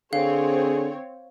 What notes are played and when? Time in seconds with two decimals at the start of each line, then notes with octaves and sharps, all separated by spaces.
0.13 D3 C4 G#4 C#5 F5